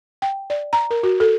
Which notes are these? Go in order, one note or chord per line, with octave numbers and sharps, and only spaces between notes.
G5
D5
A#5
A#4
F#4
A4